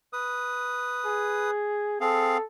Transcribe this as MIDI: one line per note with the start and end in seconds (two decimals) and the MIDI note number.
0.13 1.51 71
0.13 1.51 87
1.06 1.97 68
2.01 2.37 60
2.01 2.37 68
2.01 2.44 69
2.01 2.37 77